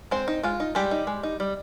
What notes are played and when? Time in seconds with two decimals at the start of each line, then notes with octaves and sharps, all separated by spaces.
0.11 G#3 C4 C5
0.28 D#4
0.43 G#3 F4
0.60 D#4
0.75 G3 G#3 G4
0.91 D#4
1.07 G#3
1.23 D#4
1.40 G3